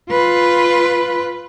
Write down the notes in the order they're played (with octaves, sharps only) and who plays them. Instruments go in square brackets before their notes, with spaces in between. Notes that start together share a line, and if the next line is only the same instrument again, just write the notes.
[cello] F4 B4